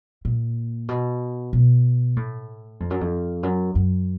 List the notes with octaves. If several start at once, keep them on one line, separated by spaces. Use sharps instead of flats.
A#2
B2
B2
A2
F2
F#2
F2
F#2
F#2